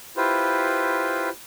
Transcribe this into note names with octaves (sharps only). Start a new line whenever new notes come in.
E4 F4 G4 B4 C5